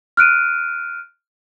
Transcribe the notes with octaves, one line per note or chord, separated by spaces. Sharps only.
F6 F#6 D7 D#7